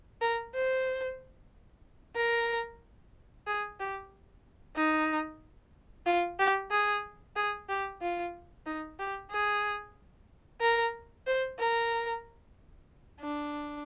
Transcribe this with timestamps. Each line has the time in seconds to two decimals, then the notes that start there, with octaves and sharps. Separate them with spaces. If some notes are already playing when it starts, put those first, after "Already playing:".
0.21 A#4
0.54 C5
2.16 A#4
3.47 G#4
3.79 G4
4.76 D#4
6.06 F4
6.39 G4
6.71 G#4
7.36 G#4
7.69 G4
8.01 F4
8.66 D#4
8.99 G4
9.31 G#4
10.61 A#4
11.27 C5
11.59 A#4
13.21 D4